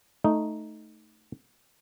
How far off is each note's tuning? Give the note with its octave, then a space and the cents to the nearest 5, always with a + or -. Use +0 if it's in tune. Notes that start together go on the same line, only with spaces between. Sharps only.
A3 +0 D#4 +0